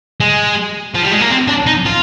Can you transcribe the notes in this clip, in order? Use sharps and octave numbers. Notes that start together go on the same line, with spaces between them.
G#3
F3
G3
G#3
A#3
C4
D4
D#4
F4